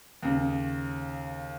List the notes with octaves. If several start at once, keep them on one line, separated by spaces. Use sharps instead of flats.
D#2 C#3